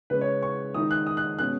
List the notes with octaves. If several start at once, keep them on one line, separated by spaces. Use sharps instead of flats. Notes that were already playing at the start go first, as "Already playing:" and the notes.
C#3 G#3 C#4 B4
C#5
C#6
D#3 G#3 D#4 D#6
F#6
D#6
F#6
B2 G#3 C#4 F#6